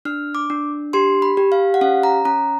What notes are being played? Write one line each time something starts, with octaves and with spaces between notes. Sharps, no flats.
D4 F6
D6
D4
G4 C6
B5
G4
F5
F#5
C#4 F5
A#5
C#4 A#5